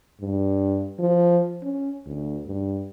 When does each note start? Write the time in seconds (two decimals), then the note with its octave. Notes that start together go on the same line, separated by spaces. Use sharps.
0.21 G2
0.99 F3
1.63 C#4
2.06 D2
2.46 G2